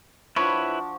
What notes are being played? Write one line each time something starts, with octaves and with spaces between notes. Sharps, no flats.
F3 D4 E4 F#4 B4 C#5 C#6